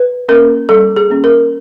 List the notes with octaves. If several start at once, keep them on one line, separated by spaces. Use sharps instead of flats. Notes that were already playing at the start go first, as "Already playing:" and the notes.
Already playing: B4
A#3 C#4 A#4
G3 A4
G#4
A#3 C#4
A#4